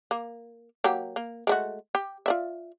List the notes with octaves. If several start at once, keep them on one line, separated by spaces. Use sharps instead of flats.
A#3
F#3 A#3 G4
A#3
G#3 A3 F#4
G4
F4 D5 E5